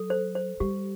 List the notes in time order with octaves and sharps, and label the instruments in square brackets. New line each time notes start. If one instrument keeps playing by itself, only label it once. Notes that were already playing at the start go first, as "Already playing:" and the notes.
Already playing: [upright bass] F#3 [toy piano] A4
[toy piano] C5
C5
[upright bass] G3 [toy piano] G4